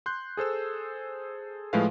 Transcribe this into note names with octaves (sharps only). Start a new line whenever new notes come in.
C6 F#6 G6
G#4 A4 C5 E6
A2 F3 G#3 A3 B4 F5